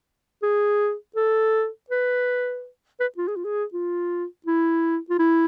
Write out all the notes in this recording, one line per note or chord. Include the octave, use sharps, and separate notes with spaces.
G#4
A4
B4
B4
F4
G#4
F4
G#4
F4
E4
F4
E4